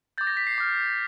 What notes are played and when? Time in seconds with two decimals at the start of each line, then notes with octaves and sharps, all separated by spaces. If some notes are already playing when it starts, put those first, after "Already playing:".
0.18 G6 A6
0.21 D6
0.27 A#6
0.37 B6
0.47 C7
0.58 D6 F6